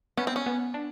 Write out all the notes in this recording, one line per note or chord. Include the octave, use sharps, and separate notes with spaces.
B3 C#4
C4
C#4
B3
D4